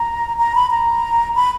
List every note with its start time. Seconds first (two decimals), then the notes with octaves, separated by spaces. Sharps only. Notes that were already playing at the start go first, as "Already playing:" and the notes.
Already playing: A#5
0.39 A#5
0.55 B5
0.71 A#5
1.36 B5